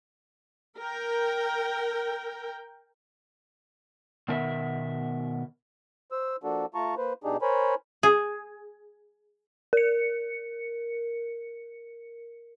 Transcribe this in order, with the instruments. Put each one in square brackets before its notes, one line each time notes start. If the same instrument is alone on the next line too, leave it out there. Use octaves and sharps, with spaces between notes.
[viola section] A#4 G5
[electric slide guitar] B2 D#3 B3 A#4 E5
[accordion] C5 E6
F3 A#3 D4 F#4 A4
A3 F4 A5 A#5 C#6
A#3 B4 C5
B2 D4 D#4 G4 G#4
A#4 C5 C#5 G#5 B5
[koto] G#4
[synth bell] A#4 C#7